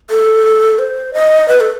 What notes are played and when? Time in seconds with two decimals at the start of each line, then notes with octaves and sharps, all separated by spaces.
0.10 A4
0.79 C5
1.14 D#5
1.48 B4
1.60 A4